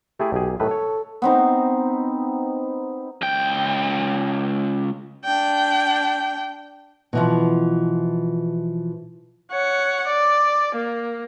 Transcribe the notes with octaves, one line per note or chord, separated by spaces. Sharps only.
A3 E4 G4 G#4
B1 G4 G#4
A2 D#3 A4 B4
C#5
B3 C4 D#4
C#2 G5
D4 G5
B2 E3 F3
C#5 F#5
D5
A#3